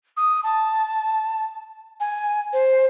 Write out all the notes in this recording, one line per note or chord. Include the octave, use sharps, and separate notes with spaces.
D#6
A5
G#5
C5